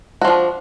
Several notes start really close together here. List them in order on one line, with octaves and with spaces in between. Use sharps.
F#4 F3 D4